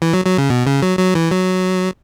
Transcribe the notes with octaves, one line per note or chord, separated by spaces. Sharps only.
E3
F#3
F#3
C#3
B2
C#3
F#3
F#3
E3
F#3